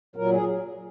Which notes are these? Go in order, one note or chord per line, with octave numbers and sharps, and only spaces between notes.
A#2 F#3 A#4
G#4